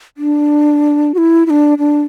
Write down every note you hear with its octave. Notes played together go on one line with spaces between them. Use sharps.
D4
F#4
E4
E4
D4
D4